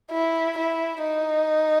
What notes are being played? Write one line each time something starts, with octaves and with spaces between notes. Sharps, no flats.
E4
E4
D#4